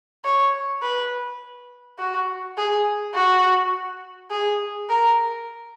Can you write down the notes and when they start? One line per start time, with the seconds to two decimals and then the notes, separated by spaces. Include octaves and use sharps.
0.25 C#5
0.82 B4
1.98 F#4
2.57 G#4
3.14 F#4
4.31 G#4
4.89 A#4